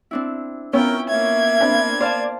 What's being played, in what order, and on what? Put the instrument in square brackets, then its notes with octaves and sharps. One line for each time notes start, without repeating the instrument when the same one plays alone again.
[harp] C4 D4 E4
[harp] B3 E4 F4 [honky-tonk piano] C#4 [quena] A#4 [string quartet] G5
[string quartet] A#3 G#6 [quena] E5
[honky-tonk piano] C4 D4 [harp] B5
[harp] C5 F5 A5 [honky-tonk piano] D5